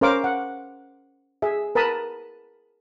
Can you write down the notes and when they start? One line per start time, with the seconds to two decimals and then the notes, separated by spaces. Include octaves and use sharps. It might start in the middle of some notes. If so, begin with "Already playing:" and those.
0.01 C#4 A#4 C5 F5 D6
0.24 F#5
1.42 G#4 E5
1.75 A#4 B4 A5 B5 D#6